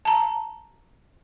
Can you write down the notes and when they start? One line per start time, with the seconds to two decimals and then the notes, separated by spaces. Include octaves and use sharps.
0.05 A5 A#5